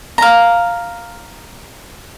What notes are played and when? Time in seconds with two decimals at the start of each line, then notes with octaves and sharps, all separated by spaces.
0.18 F5 A#5